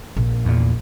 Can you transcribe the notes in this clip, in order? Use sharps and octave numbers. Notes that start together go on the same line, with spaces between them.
A#1
E2 A#2